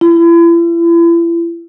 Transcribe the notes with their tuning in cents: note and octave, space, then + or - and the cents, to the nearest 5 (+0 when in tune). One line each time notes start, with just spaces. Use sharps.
E4 +40